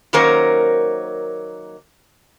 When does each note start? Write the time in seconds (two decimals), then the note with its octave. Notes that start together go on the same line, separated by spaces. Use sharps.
0.13 D#3 F#3 A#3 C#4 A#4 C5